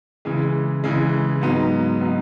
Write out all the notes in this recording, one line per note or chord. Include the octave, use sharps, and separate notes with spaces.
C#3 E3 G#3
C#3 E3 G#3
G#2 F#3 B3 D#4
F#3 B3 D#4